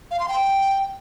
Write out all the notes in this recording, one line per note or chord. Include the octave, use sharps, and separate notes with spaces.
F5
C6
G5